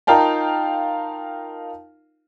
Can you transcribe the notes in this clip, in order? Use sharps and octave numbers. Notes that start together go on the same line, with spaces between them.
D#4 F4 A#4 F5 G5 A5